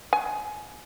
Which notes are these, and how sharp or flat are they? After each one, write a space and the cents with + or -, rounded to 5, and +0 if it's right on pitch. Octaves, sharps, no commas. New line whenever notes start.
G#5 +20